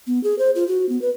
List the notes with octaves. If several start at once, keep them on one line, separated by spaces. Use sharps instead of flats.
B3
G#4
C5
F4
F#4
B3
B4